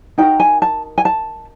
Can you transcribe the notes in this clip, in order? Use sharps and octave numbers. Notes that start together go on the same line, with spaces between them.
D#4 F#4 A#4 G5
G#5
A5
G#5
A5